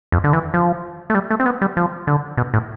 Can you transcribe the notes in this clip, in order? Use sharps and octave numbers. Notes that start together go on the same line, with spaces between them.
F2
D3
E3
F3
A3
G3
A3
C4
B3
G3
F3
D3
B2
A2